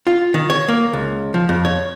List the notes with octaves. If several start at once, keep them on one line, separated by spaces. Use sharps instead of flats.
F4
D#3
C#5
A#3
C#2
F3
F2
C#5